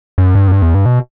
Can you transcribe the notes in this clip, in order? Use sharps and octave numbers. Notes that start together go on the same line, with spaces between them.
F#2
G2
F#2
G2
E2
G2
B2